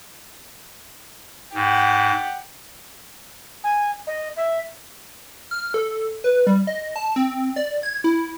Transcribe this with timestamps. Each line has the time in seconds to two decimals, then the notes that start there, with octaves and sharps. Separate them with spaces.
1.54 G#2 G4 F#5
3.64 G#5
4.07 D#5
4.37 E5
5.51 F6
5.74 A4
6.24 B4
6.47 G3
6.67 D#5
6.96 A5
7.16 C4
7.56 D5
7.83 G#6
8.04 E4